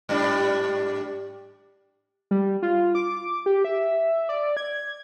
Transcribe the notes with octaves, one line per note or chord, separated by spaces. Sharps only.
G#2 G3 D4
G3
F4
D6
G4
E5
D5
G#6